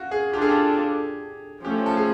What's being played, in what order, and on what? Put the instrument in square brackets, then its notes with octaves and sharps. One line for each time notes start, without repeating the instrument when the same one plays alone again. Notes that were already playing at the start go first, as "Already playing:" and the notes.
Already playing: [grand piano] F4 F#4
G#4
[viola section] D4 F4 A4 [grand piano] G4
[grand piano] G#4
G4
[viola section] F3 A3 C#4 [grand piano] G4
[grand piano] A4
G#4